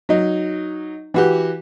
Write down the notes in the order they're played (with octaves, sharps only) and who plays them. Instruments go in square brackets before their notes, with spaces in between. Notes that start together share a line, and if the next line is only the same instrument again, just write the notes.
[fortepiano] F#3 D#4
E3 F#4 G4